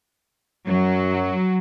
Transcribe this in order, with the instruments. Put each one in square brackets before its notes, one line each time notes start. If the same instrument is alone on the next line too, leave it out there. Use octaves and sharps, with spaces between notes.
[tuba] F#2 [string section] F#3